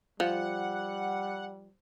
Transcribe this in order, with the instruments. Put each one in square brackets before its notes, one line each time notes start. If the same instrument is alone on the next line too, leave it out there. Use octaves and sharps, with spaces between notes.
[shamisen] F3 [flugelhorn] G3 [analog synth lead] F#5